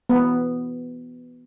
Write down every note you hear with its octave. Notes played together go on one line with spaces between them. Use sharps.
B3